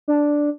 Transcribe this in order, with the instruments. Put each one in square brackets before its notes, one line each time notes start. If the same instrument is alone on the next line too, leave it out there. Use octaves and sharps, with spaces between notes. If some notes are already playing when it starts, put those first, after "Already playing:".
[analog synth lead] D4